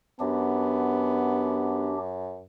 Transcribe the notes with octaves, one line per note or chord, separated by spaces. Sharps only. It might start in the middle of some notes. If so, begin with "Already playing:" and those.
F#2 B3 D4 G4